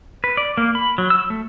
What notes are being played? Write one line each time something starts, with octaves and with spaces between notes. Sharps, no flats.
B4
D5
A#3
B5
F#3
E6
A3